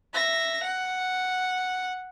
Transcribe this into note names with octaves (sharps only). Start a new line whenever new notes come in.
E5 A#6
F#5